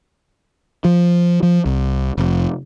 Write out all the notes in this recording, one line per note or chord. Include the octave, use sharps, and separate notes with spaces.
F3
F3
C2
F1